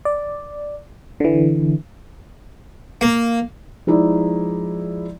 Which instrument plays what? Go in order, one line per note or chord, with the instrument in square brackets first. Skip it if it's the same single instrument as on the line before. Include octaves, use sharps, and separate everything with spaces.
[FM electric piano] D5
D3 E3
[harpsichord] A#3
[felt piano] F3 G#3 D#4 E4 D5